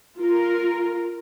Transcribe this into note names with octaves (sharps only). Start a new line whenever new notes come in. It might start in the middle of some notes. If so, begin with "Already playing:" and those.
F4 A#4